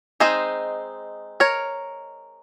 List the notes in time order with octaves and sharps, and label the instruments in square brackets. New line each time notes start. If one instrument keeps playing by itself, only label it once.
[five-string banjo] G#3 C4 D#4 C5 D#5
A#4 C#5